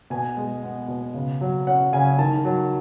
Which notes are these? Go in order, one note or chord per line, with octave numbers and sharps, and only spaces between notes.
B2 G#5
G#3
B3
B2
C#3
F#3
C#4 F#5
C#3 G#5
D#3 A5
F#3